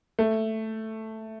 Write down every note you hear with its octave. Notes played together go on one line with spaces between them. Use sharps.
A3